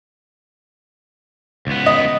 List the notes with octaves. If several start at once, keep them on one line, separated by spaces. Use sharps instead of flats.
C#2 B3
D#5